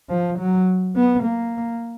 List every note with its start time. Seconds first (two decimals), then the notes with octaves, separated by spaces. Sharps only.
0.10 F3
0.38 F#3
0.96 B3
1.24 A#3